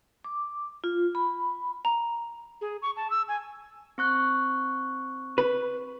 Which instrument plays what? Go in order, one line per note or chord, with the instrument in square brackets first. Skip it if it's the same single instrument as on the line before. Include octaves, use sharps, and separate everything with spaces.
[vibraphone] D6
F4
B5
[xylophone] A#5
[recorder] G#4
C#6
A5
E6
G#5
[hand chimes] C4 C#6 F#6
[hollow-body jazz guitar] B4